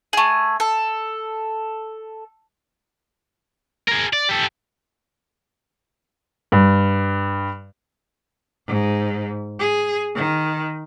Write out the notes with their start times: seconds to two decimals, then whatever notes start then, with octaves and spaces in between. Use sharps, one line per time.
0.13 A3 G#4
0.60 A4
3.88 G#4 A#4
4.13 D5
4.29 G4 A4
6.52 G2
8.67 G#2
9.59 G#4
10.15 D#3